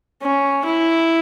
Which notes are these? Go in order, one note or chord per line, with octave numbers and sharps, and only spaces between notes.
C#4
E4